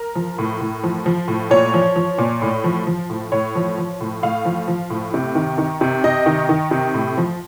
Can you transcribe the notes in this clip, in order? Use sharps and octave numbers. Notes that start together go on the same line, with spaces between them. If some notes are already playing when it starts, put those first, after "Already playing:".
Already playing: A#4
F3
A2
A2
F3
F3
A2
A#2 C#5
F3
F3
A#2
A2
F3
F3
A2
A2 C#5
F3
F3
A2
A2 F5
F3
F3
A2
C3
D#3
D#3
C3
C3 D#5
D#3
D#3
C3
A2
F3